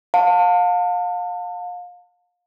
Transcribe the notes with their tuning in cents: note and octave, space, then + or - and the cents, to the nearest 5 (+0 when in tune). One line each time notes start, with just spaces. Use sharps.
F5 +30 A5 +30